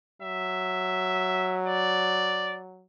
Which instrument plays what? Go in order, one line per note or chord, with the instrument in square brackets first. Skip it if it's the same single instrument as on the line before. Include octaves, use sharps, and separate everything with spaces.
[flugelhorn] F#3 [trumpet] E5
[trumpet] D5